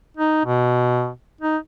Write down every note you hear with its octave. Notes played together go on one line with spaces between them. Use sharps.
D#4
B2
D#4